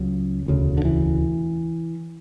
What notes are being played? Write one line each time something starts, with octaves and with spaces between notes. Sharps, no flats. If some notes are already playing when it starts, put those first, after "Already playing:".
Already playing: C#2 C#3 F#3
E1 D2 C#3
D3
E3